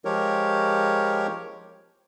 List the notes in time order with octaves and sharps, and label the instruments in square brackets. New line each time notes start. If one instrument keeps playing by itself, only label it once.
[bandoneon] F3 G#3 G4 A#4 C#5